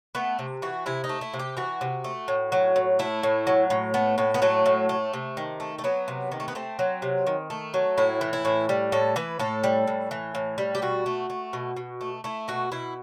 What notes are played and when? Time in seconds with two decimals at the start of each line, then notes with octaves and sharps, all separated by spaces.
0.15 A3 B3
0.39 C3
0.62 E3 F#4
0.86 C3 E4
1.04 D#4
1.09 A3
1.21 E4
1.33 C3
1.39 G4
1.57 E3 F#4
1.81 C3
2.04 A3
2.28 A2
2.52 F#3
2.76 A2
2.99 A3 E4
3.23 A2
3.47 F#3
3.70 A2
3.94 A3 B3
4.18 A2 B3
4.34 B3
4.42 F#3 A3
4.66 A2
4.89 A3
5.13 C3
5.37 D#3
5.60 A3
5.79 A3
5.84 F#3 B3
6.08 C3
6.32 D#3
6.40 A3
6.48 B3
6.55 A3 C4
6.79 F#3
7.02 C3
7.27 D#3
7.50 A3
7.74 F#3
7.98 A2 E4
8.21 E3
8.33 E4
8.45 A2
8.69 G3
8.92 A2 A4
9.16 E3 B4
9.39 A2 A4
9.64 G3
9.87 A2
10.11 E3
10.35 A2
10.58 G3
10.75 G4
10.82 B2 F#4
11.06 A3
11.30 A3
11.53 B2
11.77 B2
12.01 A3
12.24 A3 E4
12.48 B2 F#4
12.72 B2 E4